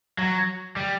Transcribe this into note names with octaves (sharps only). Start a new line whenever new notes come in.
F#3
G3